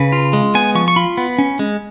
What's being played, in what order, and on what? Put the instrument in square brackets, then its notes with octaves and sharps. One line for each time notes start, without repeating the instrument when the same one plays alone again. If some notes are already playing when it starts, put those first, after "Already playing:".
Already playing: [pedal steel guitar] C#3 B4
F4
G#3
B3 G#5
F3 C#6
C#6
F4 B5
B3
C#4
G#3